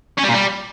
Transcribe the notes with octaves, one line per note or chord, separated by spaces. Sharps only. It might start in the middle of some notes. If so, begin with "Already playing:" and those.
C#4
G3
A#2
G3